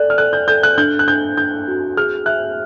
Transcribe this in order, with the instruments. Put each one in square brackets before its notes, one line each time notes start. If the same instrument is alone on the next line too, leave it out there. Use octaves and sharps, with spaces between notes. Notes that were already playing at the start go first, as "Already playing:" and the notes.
Already playing: [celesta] A4 D5 [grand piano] F#6
[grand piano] F6
[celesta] A4 [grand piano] F#6
[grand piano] G6
[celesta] A4 [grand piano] G6
[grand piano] F#6
[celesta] D4 [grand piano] G6
[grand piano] F#6
[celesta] D4 [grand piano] G6
[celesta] D4 [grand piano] G6
[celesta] F#4
[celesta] G#4 [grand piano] F6
[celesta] E5 [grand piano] F#6